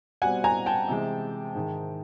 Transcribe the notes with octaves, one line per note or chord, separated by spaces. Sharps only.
B2 G3 C4 F#5 G#5
G#5 A#5
G5 A5
C3 E3 G#3
G#2 D#3 G#3